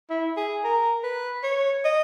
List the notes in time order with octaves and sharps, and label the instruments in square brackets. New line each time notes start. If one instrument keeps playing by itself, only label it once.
[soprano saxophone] E4
G#4
A#4
B4
C#5
D#5